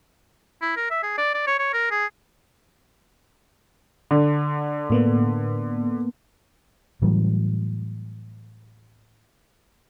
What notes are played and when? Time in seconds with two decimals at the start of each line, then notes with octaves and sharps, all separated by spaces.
0.62 E4
0.77 A#4
0.91 E5
1.03 G#4
1.18 D5
1.34 D5
1.47 C#5
1.59 C#5
1.73 A#4
1.91 G#4
4.11 D3
4.90 A2 A#3 B3
7.02 A2 E3 F#3 G3